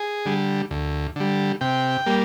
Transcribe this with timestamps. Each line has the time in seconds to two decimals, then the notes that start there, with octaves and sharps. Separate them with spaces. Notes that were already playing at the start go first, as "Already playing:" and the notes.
Already playing: G#4
0.26 D3 G3
0.71 D2
1.16 D3 G3
1.61 C3 G5
2.06 G3 A#3